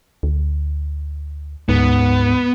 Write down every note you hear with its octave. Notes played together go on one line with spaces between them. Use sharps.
D2
D2 G#2 B3